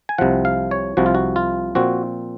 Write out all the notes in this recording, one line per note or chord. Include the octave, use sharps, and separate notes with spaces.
G#5
C2 C3 F3 F#5
F5
C#5
C2 C3 F3 F#4
F4
F#4
F4
A#2 F3 C4 F#4